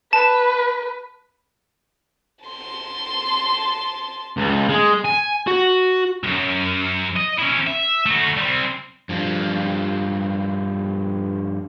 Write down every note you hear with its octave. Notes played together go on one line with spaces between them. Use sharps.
B4 A5
A5 C6
C#2
G#3
G#5
F#4
C2 F#2
D#5
C#4 E4
E5
A3 F#4
G3 C4
G2 F3